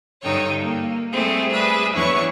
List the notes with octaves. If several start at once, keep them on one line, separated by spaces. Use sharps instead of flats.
G2 D3 D#4 A4 C#5 G5
A#3
G3 A3 C4 E4 G#4 A4
G#4 B4 D5 E5
E2 E3 D4 E4 C#5 C#6